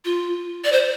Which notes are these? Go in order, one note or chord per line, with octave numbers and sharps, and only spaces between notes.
F4
D5
C5